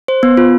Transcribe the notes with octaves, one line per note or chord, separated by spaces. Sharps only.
C5
B3
F4